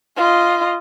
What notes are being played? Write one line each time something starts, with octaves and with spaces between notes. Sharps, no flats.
F4 D#5